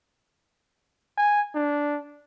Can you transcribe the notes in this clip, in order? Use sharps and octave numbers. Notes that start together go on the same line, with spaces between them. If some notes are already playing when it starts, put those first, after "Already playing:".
G#5
D4